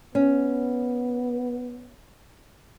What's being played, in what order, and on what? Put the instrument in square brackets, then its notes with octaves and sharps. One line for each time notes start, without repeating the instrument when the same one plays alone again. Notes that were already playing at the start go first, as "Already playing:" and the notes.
[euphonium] B3 [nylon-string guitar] C#4